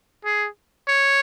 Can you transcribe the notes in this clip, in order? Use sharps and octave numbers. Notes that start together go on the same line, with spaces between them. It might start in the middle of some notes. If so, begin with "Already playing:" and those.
G#4
C#5